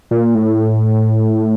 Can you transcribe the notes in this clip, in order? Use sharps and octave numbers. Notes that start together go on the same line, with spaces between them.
A#2
A2